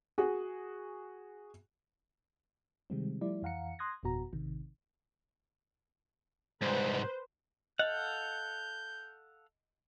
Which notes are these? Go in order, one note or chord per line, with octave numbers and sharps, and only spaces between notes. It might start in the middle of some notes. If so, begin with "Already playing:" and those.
F#4 G#4
C3 D#3 G3 G#3 C4
F3 G3 A3 E4 D5
F2 E3 F5 F#5 A#5 C#7
C6 D#6 F#6 G#6 A#6
G1 F2 B2 B3 F#4 A#5
A1 C3 D#3
C2 G#2 B4 C5
A4 D#5 F5 F#5 G6